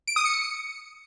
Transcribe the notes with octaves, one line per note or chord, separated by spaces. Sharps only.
D7
D#6
C#7